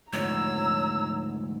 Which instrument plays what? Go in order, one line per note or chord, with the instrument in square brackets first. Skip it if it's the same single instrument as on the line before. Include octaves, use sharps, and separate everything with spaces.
[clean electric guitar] D2 G#2 F3 [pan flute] C#5 [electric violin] A#5 E6